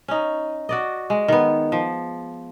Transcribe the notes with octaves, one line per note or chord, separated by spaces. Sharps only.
C#4 D#4
F#4 D5 D#5
G#3
D#3 B3
F3